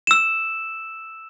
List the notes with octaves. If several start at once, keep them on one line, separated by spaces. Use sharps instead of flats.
E6 E7